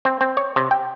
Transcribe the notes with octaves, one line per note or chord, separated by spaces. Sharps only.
C4
C4
C#5
C3
G5